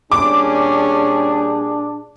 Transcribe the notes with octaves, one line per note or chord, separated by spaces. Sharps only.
A#2 G3 C#4 D4 G#4 D6